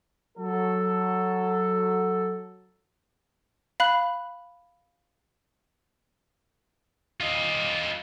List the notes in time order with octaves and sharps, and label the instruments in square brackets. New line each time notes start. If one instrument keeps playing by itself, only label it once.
[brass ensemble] F#3 A4
[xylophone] F5 B5 F#6
[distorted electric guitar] F4 D#5